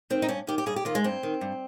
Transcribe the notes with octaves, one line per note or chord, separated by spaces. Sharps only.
D#3 C4
D#4
G2 C#4
D#3 G4
G4
G2 G#4
G4
D#3 F4
G#3
G2 C4
D#3
G2